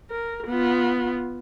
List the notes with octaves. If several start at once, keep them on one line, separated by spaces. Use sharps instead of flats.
A#4
B3 F4